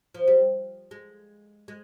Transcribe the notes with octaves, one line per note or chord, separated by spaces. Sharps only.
F3
G3
G#3
G#3